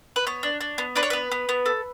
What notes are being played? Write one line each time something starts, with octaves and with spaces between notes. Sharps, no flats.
B4
B3 C#5
D4
D4
B3
D4 B4
C#5
B3 B4
B3
B3
A4